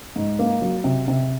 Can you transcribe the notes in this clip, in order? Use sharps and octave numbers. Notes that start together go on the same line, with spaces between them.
G#2
A#3
F#3
C3
C3